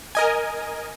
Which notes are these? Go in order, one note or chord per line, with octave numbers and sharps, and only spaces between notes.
A#4 D#5 G#5